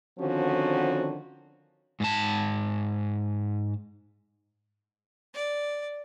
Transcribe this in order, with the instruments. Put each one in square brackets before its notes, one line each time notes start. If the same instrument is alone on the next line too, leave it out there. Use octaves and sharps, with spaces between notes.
[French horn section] D3 D#3 F3 C4 C#4 F#4
[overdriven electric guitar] G#2 A5
[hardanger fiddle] D5